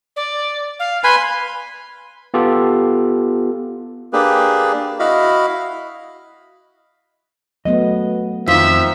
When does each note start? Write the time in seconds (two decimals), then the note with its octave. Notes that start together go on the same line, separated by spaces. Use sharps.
0.16 D5
0.79 F5
1.04 B4 G#5 B5 C6
2.34 B3 F4 G4 A4
4.13 A#3 D4 G4 G#4 B4
4.99 E4 F#4 D#5 F5 B5
7.65 F#3 A3 B3 D#5
8.48 F2 D#3 F3 E5